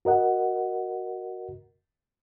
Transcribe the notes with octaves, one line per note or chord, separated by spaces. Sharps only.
F#4 A#4 D#5 F#5